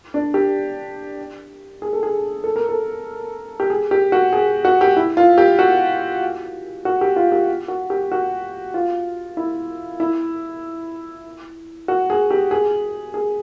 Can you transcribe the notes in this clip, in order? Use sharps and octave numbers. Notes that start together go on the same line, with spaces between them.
D4
G4
G#4
A4
G#4
A4
A#4
A4
G4
G#4
G4
F#4
G#4
F#4
G4
E4
F4
G4
F#4
F#4
G4
F4
G4
F#4
G4
F#4
F4
E4
E4
F#4
G#4
G4
G#4
G#4